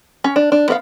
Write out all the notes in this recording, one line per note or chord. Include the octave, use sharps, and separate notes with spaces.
C#4
D4
D4
B3 A#4 F5